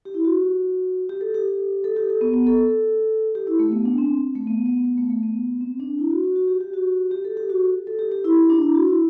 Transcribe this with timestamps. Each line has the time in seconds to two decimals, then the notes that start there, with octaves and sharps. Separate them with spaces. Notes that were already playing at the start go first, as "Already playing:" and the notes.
0.05 G4
0.14 E4
0.24 F#4
1.09 G4
1.21 A4
1.34 G4
1.84 A4
1.97 G4
2.09 A4
2.21 B3
2.34 B3
2.47 A4
3.35 G4
3.47 E4
3.59 A3
3.72 B3
3.85 D4
3.98 C4
4.35 A3
4.47 B3
4.66 B3
4.85 B3
4.98 A3
5.10 A3
5.23 B3
5.61 C4
5.80 D4
5.99 E4
6.11 F#4
6.24 F#4
6.36 F#4
6.48 G4
6.61 G4
6.73 F#4
7.11 G4
7.25 A4
7.37 G4
7.50 F#4
7.87 A4
7.99 G4
8.12 G4
8.25 E4
8.37 E4
8.50 D4
8.62 E4
8.74 F#4
8.87 E4